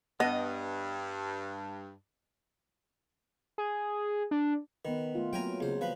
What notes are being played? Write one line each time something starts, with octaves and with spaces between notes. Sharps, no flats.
G2 B3 D#5
G#4
D4
D#3 B3 B4
A3 F4
F#3 A#3 C4 G5 G#5 A#5
C#2 C5
F3 B4